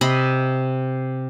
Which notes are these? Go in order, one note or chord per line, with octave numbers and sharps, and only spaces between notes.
C3 D#5 B5